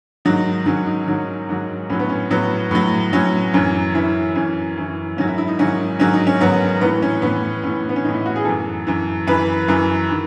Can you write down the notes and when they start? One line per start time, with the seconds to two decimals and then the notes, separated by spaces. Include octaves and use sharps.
0.25 G#2 D#3 F#3 D#4
0.66 G#2 D#3 F#3 C#4
0.86 D#4
1.08 G#2 D#3 F#3
1.49 G#2 D#3 F#3
1.90 A2 F#3 C#4
1.99 B3
2.10 C#4
2.30 A2 F#3 B3
2.71 A2 F#3
3.13 A2 F#3 C#4
3.53 F#2 E3 C#4
3.94 F#2 E3 E4
4.35 F#2 E3 C#4
4.77 F#2 E3
5.17 G#2 D#3 F#3 C#4
5.27 E4
5.38 E4
5.48 D#4
5.59 G#2 D#3 F#3 C#4
5.99 G#2 D#3 F#3 C#4
6.13 D#4
6.27 C#4
6.41 G#2 D#3 F#3 B3
6.81 A2 E3 B3
7.02 C#4
7.22 A2 E3 B3
7.64 A2 E3 C#4
7.89 B3
7.96 C#4
8.04 E3 D#4
8.09 A2
8.14 E4
8.26 F#4
8.36 G#4
8.45 F#2 E3 A4
8.87 F#2 E3
9.27 F#2 E3 B4
9.68 F#2 E3
10.11 D#3